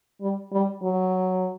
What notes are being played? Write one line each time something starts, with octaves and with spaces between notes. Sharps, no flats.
G3
G3
F#3